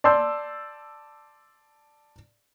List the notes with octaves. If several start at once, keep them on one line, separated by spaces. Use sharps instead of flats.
D5 A5 C6 E6 G6